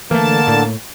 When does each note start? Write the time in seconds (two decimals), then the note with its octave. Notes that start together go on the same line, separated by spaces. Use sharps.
0.11 D3 E3 A3 A#3 A5
0.48 A2